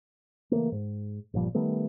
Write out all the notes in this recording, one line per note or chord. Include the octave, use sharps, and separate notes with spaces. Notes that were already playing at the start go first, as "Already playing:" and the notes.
C#3 E3 A3 A#3
G#2
G1 A#2 F3 G3
D#3 G3 A3 B3